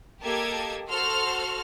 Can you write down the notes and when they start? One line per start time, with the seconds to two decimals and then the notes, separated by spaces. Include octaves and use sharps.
0.22 A#3 G4 A4 D#5 A5 G#6
0.88 F#4 A4 C5 C6 F6